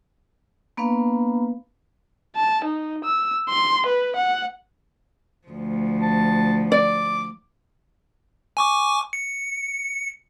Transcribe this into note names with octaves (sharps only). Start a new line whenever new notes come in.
A#3 B3 D4 B4 F5
A5
D#4
E6
C6
B4
F#5
D2 F3
A5
D5 D6
G#5 C#6 D6
C#7